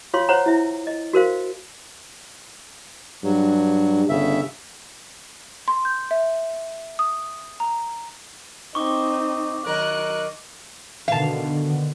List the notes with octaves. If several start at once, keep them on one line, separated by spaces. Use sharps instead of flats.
F4 C#5 F5 C6
C5 C#5 F#5 A#5
E4 E5
D#5
F#4 A#4 C5 F5
G2 F#3
G1 C#3 E5
C6
G6
E5
D#6
A#5
C4 D#4 C#6 D6
D#3 F#3 A#4 F#6
B2 D3 D#3 F5 A5